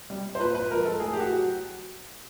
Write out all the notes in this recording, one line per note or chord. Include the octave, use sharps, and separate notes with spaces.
G3
C5
A#2 B4
B4
F3 G#3 A#4
A4
A2 G#4
G4
F#4
F#3